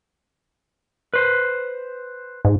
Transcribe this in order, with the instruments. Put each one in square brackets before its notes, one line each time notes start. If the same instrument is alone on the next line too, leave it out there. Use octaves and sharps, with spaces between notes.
[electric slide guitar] B4 C5
[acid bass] G#2